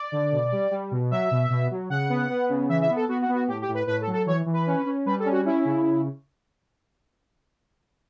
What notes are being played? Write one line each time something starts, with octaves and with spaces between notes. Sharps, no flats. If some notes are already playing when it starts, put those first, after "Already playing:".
Already playing: D5
D3
B2
G3
G3
B2
F#3 E5
B2
B2
F#3
C#3 F#5
B3
B3
C#3
E3 E5
E5
B3
A4
B3 F#4
F#4
B3
F#4
A2 G4
G4
A2
B4
A2 B4
A4
F#3
A4
E3 C#5
E3
B4
C#4
C#4
G3 B4
A4
C#4
F#4
C#4 E4
C#3